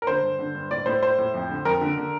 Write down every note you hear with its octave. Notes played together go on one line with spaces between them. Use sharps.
A#4
D3 C5
G2
D3
G2
A2 D5
A2 C5
A2 C5
A2
F2
D3
F2 A#4
D3
D3